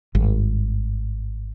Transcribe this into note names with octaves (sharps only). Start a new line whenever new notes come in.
G#1 G2